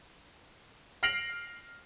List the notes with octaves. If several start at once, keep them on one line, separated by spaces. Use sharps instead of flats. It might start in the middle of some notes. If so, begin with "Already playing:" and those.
F6 A#6 C7 D7 F7 F#7